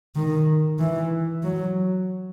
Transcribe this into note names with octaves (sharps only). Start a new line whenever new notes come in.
D#3
E3
F#3